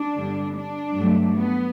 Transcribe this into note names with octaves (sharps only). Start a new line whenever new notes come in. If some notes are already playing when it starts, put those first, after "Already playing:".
Already playing: D4
G2 D3 G3 B3
D4
G2 F#3 A3
B3